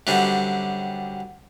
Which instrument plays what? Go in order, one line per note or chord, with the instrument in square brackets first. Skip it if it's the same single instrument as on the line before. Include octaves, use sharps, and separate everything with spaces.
[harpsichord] F#2 D3 G3 C4